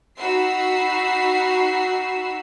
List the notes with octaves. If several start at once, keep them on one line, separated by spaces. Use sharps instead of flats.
D#4 F#4 B5 E6 C7